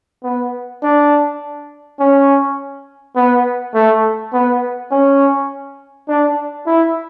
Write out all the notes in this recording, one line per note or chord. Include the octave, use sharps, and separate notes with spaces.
B3
D4
C#4
B3
A3
B3
C#4
D4
E4